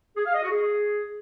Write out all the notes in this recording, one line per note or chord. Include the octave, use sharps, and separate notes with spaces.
G#4
F5
D#5
F#4
G#4